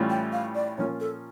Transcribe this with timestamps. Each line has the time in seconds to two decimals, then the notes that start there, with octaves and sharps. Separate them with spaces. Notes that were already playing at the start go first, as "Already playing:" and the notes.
Already playing: A2 E3 G3 C#4 F4
0.10 G5
0.32 F5
0.55 D5
0.78 A#2 F3 C#4 F4 A#4 C#5
1.00 A4